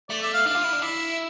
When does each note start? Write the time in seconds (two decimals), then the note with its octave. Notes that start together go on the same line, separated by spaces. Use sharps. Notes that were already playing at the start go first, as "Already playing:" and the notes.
0.10 A3 D5
0.22 E5
0.33 F5
0.46 D4 F5
0.55 F4
0.64 E4
0.73 D4
0.82 E4 E5